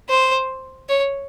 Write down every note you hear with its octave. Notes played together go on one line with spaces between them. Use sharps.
C5
C#5